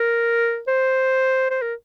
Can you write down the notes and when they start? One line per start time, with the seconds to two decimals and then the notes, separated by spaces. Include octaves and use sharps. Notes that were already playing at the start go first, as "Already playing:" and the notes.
Already playing: A#4
0.68 C5
1.50 C5
1.62 A#4